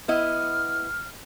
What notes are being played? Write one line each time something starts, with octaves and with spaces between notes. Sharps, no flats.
B3 E4 D#5 F6